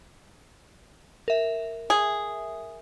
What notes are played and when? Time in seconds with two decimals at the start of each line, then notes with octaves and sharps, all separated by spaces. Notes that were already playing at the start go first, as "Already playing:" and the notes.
1.28 A#4 E5
1.90 G#4